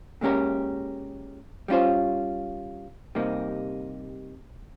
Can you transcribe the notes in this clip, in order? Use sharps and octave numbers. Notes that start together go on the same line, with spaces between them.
A#2 G#3 C#4 G4 A#4
G3 C#4 F4 C5
C3 G3 A#3 D#4